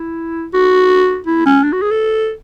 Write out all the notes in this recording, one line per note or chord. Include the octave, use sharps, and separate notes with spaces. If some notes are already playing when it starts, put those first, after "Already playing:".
Already playing: E4
F#4
E4
C#4
D4
F#4
G#4
A4